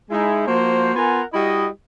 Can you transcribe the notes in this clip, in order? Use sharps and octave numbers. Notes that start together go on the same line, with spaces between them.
G#3 D#4 E4
F3 A#3 F#4 C5
B3 F4 A#4 F#5 G#5
G3 E4 F#4 D#5